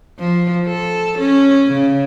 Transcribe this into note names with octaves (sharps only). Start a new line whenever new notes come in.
F3
A4
C#4
C#3